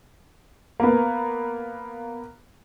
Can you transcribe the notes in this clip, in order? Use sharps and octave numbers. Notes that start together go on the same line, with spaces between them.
A#3 B3